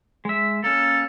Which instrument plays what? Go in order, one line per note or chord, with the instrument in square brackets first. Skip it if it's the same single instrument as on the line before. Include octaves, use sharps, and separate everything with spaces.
[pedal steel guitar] G#3 E5
[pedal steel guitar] A#3 C#4 [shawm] A4